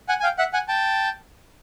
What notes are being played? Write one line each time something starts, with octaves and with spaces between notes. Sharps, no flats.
F#5 G#5
G#5
F5 G5
E5 F#5
F#5 G#5
G5 A5